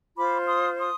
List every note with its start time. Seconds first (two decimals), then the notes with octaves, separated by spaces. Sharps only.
0.16 F4 C5 B5 D6
0.46 C6 D#6
0.78 C6 D#6